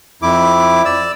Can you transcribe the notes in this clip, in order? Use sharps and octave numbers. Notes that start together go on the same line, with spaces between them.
F2 E4 D6
D5 E6